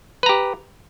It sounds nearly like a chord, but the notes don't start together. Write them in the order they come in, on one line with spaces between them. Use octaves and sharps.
B4 A#5 G4